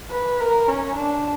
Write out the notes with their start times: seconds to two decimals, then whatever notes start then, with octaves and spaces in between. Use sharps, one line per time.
0.11 B4
0.40 A#4
0.68 C#4
0.97 D4